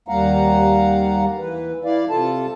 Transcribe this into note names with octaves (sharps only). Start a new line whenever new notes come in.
D#2 G3 A#3 F5 F#5 A#5
E3 B4
E4 D5 F5
C3 F4 A4 A5